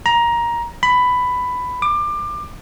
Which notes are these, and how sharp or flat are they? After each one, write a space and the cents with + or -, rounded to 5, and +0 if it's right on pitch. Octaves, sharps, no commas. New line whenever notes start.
A#5 +15
B5 +10
D6 +25